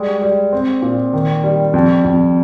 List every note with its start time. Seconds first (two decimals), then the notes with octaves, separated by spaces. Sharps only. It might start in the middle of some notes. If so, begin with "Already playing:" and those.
Already playing: G3 G#3
0.22 G3
0.53 C4
0.82 A#2
1.13 D#3
1.44 G3
1.74 F2
2.04 F2